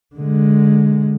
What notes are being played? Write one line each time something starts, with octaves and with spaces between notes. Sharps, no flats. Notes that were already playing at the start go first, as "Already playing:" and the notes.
D3 G#3